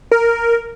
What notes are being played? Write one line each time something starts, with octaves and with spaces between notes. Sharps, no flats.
A#4